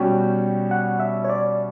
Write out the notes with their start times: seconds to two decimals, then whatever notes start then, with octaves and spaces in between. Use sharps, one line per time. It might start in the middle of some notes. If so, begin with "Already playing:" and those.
Already playing: B2 G3 C#4 F#4 G5
0.71 F#5
1.00 E5
1.24 C#5
1.29 D5